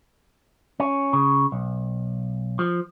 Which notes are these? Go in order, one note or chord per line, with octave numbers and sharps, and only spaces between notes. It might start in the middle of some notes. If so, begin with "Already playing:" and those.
C#4
C#3
B1
F3